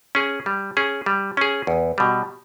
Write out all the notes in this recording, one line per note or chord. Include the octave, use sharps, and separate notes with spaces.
C#4 G#4
G3
C#4 G#4
G3
C#4 G#4
E2
B2 G3